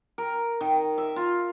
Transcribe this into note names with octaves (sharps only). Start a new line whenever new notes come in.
A#4
D#3
E5
F4